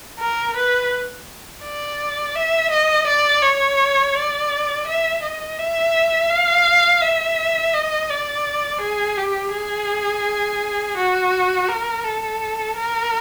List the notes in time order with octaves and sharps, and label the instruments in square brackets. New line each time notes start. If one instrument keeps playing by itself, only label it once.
[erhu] A#4
B4
D5
E5
D#5
D5
C#5
D5
E5
D#5
E5
F5
E5
D#5
D5
G#4
G4
G#4
F#4
A#4
A4
A#4